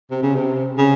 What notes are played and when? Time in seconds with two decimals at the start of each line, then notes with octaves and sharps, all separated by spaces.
0.11 C3
0.22 C#3
0.35 C3
0.78 C#3